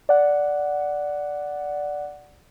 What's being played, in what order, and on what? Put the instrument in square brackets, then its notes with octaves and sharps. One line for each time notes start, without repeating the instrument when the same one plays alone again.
[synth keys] D5 F#5